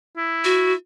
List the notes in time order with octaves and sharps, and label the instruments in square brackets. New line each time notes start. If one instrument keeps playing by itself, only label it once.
[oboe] E4
[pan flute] F#4